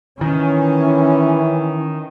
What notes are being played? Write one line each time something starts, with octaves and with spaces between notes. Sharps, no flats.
D#3 E3 C#4